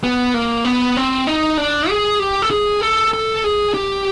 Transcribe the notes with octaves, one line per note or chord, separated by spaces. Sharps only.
B3
A#3
B3
C4
D#4
D4
G#4
G4
A4
G#4
A4
A4
G#4
G4